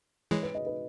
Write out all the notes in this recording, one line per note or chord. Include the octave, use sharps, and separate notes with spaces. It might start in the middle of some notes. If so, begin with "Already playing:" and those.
E3 G#3 C#5
B4
D#5
B4